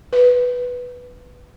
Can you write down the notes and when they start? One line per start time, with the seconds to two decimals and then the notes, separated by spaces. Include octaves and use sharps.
0.13 B4